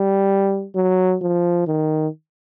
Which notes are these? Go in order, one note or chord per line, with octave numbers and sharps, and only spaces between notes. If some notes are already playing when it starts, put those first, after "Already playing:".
Already playing: G3
F#3
F3
D#3